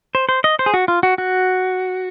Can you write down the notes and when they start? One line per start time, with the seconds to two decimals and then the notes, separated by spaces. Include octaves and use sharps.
0.15 C5
0.29 C5
0.44 D#5
0.59 C5
0.66 G#4
0.74 F#4
0.88 F4
1.03 F#4
1.18 F#4